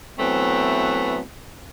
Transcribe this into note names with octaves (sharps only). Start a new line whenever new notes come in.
E3 F#3 A3 B3 C4